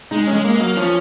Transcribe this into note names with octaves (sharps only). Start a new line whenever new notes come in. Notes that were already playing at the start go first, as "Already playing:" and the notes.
G#3 D#4
C#4
G#3
A#3
A#3
F#3
F3 C#4